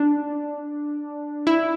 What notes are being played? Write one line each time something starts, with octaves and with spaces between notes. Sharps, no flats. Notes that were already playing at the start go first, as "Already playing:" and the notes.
Already playing: D4
E4